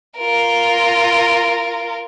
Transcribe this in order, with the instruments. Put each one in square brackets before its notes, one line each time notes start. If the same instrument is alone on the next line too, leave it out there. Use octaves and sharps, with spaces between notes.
[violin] F4 A#4